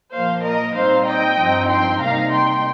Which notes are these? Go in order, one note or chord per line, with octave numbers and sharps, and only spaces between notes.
A#2 F3 A#3 C5 F5
A#4 D#5
A#2 G3 C4 D#4 C5 F5
D#5 G5
G2 F3 C4 D#4
G5 C6
C3 G3 A#3 D#4 F5 A#5
G5 C6